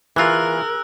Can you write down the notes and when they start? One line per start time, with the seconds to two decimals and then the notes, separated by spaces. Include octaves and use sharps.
0.16 E3 F4 G#4 A#4 E6 F#6